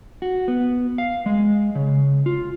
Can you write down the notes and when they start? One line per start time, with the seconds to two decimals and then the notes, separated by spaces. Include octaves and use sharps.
0.22 F#4
0.48 B3
0.98 F5
1.26 G#3
1.75 C#3
2.26 F4